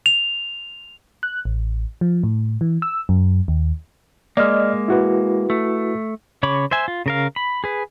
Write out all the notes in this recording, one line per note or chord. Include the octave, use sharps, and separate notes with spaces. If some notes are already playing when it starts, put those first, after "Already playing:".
F7
F#6
A1
F3
A2
E3
E6
F#2
D#2
G#3 A#3 D5 D#5 F6
E4 F#4 B4
A3
C#3 C#5 B5 C#6 D6
C5 E5 G#5
F4
C#3 A#4 F5
B5
G#4 B4